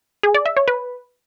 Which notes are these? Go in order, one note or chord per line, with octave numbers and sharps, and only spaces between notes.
G#4
D5
E5
C#5
B4